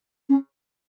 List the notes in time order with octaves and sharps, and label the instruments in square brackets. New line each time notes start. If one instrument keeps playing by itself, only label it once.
[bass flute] C#4